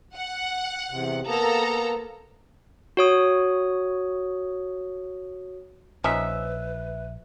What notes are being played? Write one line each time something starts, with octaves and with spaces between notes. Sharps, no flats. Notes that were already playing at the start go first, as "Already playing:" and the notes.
F#5
E2 C3
A#3 B3 A4 A#5
F#4 C#5 D#6
A#1 F3 C#4 D#4 B4 E5